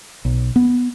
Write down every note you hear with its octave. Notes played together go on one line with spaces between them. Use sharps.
B1
B3